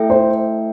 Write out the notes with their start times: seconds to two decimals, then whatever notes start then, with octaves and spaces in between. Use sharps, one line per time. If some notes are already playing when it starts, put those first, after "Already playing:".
Already playing: A3 E4 A4 E5 G5
0.10 C5